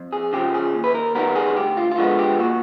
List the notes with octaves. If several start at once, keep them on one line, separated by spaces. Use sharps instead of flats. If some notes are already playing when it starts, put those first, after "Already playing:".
Already playing: F2
G#4
C#3 F3 G4
G#4
D#2
B4
A#4
D#3 G3 B3 A#4
G#4
D2 G4
F4
F4
D3 F3 G#3 B3 F#4
G4
A#2 F#4